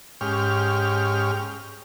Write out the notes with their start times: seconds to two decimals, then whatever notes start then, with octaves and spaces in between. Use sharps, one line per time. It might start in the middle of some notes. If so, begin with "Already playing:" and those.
0.21 G#2 C#4 G4 F6